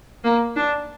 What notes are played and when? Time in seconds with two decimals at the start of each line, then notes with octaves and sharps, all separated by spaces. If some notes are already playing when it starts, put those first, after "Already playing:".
0.24 A#3
0.56 D4